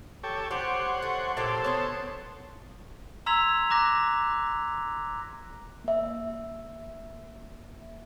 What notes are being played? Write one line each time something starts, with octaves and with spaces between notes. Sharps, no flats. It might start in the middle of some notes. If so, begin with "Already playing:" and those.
G4 A4 C#5
G4 C5 C#5 F#5
A3
A#2 F#3 G4 A4 C5
B3 C#5
A#5 C6 E6 G#6 B6 F7
A#5 D6 F#6 A#6
A#3 E5